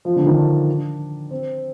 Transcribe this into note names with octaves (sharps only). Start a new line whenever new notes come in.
F3
D3
D#3
D4
C4